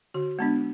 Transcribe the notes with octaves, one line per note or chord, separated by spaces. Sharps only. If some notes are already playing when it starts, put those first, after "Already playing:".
D3 F#4
G#3 B3 D4